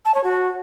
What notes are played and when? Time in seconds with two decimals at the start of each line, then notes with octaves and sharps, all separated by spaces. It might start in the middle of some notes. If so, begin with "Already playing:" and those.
0.05 A5
0.15 C#5
0.24 F#4